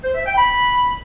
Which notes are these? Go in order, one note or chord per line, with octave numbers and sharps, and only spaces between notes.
C5
E5
G5
B5